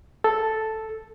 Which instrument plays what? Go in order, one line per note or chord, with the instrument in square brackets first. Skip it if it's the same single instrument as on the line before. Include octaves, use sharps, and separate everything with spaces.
[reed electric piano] A4